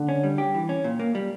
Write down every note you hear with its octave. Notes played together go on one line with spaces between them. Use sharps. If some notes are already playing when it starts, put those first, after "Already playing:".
Already playing: D3
C#4
G3
G4
E3
C#4
A#2
A#3
G3